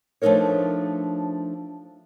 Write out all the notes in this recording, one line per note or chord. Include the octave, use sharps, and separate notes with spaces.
F3 A3 D4 D#4 A#4 C#5